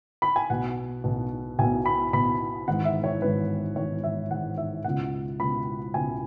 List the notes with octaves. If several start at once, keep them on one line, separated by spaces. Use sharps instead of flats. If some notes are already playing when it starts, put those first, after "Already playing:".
B5
G#5
B1 B2 F#5
B1 B2
B1 B2 G#5
B5
B1 B2 B5
G#1 G#2 E3 F#5
E5
C#5
G#1 G#2 E3 B4
G#1 G#2 E3 C#5
E5
G#1 G#2 E3 F#5
E5
C#2 B2 F#5
C#2 B2 B5
C#2 B2 G#5